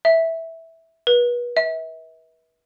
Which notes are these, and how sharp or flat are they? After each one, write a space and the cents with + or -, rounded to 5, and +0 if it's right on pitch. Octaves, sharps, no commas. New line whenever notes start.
E5 -10
B4 -35
E5 -35